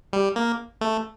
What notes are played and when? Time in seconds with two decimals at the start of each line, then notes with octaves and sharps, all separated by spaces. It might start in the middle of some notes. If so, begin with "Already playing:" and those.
0.13 G3
0.36 A#3
0.81 A3